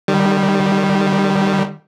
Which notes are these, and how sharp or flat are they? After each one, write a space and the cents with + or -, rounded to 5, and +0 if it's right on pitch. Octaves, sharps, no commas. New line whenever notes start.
D#3 -30 G3 -5